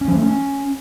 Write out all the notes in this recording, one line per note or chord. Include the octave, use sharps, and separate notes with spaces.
C#4
F3
A3
C#4